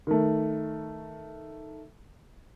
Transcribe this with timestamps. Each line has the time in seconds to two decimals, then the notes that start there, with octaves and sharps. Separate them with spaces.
0.07 D#3 A3